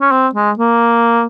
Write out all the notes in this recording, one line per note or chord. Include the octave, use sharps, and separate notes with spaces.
C#4
C4
G#3
A#3